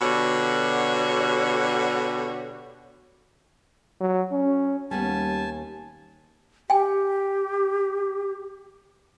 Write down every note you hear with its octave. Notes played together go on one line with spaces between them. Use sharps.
B2 D3 F#4 G4 C#5
F#3
C#4
D#2 G3 B3 C#4 G#5 A5
G4 G5 G#5